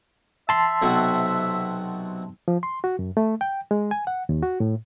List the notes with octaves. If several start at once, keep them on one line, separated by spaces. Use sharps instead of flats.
E5 A5 C6
B1 C3 F#4
F3
C6
F#4
F#2
A3
G5
G#3
G#5
F#5
D#2
F#4
A2